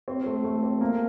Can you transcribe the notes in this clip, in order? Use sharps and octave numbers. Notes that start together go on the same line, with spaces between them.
C4
A3
A3
C4
A#3